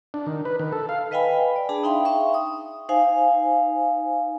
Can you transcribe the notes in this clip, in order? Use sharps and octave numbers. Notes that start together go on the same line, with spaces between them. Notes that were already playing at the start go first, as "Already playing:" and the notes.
D4
D#3
B4
D#3
A4
F5
B4 D#5 F5 G5 G#5 B5
D5
D4 G#4 A5 B5
D#4 E5 F5 G5 C6
E5 F5 C#6
D#6
D#4 C5 F5 G#5